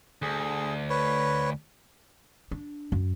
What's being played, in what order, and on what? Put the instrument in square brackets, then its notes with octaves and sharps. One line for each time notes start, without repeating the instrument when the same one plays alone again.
[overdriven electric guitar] D2 [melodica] G#4
[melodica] B4 C#5
[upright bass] D4
F#2